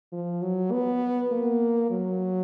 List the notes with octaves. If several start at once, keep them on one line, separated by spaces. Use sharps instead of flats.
F3
F#3
B3
A#3
F#3